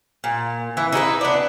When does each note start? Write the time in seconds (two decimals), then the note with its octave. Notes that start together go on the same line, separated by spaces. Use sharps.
0.24 A#2
0.77 E3
0.92 D#4 E4 F#4 B4
1.21 B3 D4